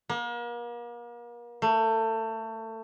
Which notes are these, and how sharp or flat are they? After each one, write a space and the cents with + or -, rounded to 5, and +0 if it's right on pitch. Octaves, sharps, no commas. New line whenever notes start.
A#3 +40
A3 +25